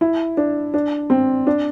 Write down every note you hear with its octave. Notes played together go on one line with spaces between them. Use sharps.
E4
D4
D4
C4
D4